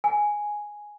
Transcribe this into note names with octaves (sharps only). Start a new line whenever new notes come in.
G#5